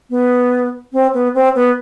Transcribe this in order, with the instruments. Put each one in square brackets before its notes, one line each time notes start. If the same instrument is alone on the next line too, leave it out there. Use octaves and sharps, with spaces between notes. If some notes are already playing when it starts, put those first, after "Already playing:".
[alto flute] B3
C4
B3
C4
B3